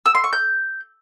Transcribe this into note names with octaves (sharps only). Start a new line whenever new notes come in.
E6
C6
C#6
G6